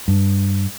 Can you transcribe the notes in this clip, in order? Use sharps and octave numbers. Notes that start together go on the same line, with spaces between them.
G2